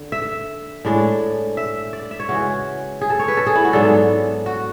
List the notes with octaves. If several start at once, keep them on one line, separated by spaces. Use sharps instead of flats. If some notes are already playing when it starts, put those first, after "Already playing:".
Already playing: D3
E5
A2 G#3 D4
E5
D5
E5
C#5
C#3 E3 G#3 F#4
G#4
A4
C#5
B4
A4
G#4
E4
F#4
G#2 F#3 B3 D4 A4
F#4